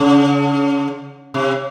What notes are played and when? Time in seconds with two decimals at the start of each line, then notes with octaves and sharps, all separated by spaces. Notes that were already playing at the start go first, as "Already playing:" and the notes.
Already playing: C#3
1.34 C3